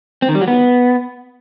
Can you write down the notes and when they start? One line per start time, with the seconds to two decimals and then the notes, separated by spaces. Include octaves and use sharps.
0.22 C4
0.29 D#3
0.35 G3
0.41 F#3
0.48 B3